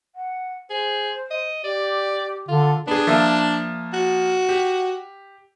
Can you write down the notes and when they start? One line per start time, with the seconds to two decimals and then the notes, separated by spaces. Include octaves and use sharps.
0.15 F#5
0.70 G#4 C5
1.31 D#5
1.64 G4 D5
2.48 D3 F4 A4
2.87 B3 D4 G#4
3.07 F3 A#3 E5
3.93 F#4
4.49 G4